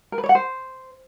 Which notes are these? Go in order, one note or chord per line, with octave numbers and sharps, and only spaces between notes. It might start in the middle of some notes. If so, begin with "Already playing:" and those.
A#4
B4
C#5
F#5
C5